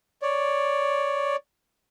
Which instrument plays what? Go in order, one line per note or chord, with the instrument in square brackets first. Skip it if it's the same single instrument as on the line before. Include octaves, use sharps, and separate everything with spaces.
[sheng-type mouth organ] C#5 D5